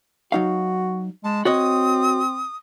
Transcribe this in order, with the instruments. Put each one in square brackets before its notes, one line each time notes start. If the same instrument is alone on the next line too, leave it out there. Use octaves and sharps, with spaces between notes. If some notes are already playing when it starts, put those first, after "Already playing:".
[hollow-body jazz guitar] F#3 D#4 F5 [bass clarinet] F#4
[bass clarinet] G#3 [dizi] A5
[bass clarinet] C4 [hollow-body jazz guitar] F#4 C#5 D#5 [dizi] D#6